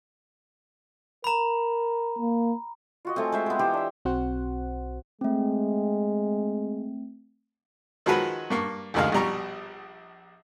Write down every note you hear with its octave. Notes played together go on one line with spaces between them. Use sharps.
A#4 A#5 B5
A#3
F4 F#4 D#5
A3 C4 C#5 G#5
G#3 C5 E5
B3 A4 G5
E3 G4 C5
D4 E6
B1 C4 F#4 C5 F#5
G#3 A3 C4
D#3 F3 F#3 G#3 F#4 B4
G2 A#3 C#6
A1 D2 D#3 G#3 F5
A#1 B2 G3 A#5 C#6